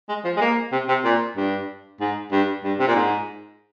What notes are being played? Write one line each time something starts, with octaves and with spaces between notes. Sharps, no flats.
G#3
F3
G#3
A#3
C3
C3
A#2
G2
G#2
G2
G2
C3
A#2
G#2